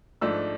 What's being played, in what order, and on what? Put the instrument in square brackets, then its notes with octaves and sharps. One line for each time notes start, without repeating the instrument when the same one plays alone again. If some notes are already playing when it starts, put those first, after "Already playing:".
[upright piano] G#2 F3 A3 D4 E6